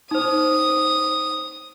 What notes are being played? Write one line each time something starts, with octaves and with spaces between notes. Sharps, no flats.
D#4 C5 D#6